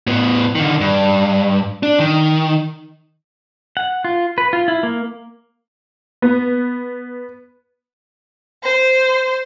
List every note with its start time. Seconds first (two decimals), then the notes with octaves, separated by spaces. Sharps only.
0.07 A2 B3
0.55 D3 D#3
0.81 G2
1.83 D4
2.00 D#3
3.77 F#5
4.04 F4
4.38 B4
4.53 F4
4.68 E4
4.83 A#3
6.22 B3
8.63 C5